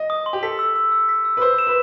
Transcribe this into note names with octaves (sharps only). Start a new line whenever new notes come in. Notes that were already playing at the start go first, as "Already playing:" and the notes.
Already playing: D#5
D#6
C6
G4
A4 B6
E6
E6
E6
B6
E6
B4
C5 E6
E7
B4